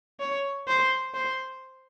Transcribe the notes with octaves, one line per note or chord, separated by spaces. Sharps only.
C#5
C5
C5